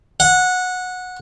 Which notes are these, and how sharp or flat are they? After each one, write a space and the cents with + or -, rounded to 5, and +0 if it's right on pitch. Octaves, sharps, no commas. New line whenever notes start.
F#5 -15